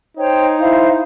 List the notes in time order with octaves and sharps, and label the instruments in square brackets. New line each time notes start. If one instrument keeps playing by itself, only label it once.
[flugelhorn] D#4 [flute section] C5 C#5 G5
[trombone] E4 [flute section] C5 F5